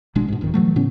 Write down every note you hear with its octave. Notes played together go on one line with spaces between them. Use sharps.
G#1 B2 G#3 D4
G#2 B2
D1 E2 A2 D#3
B2 E3 F#3 A3
A2 C#3 B3 C#4